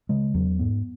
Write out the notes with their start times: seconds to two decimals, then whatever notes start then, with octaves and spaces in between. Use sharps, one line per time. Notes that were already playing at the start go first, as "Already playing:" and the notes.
0.09 C#3 G#3
0.34 E2 F#3
0.59 G#2 B3